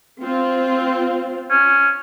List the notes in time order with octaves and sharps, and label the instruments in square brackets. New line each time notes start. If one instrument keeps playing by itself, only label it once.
[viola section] C4 F4
[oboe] C#4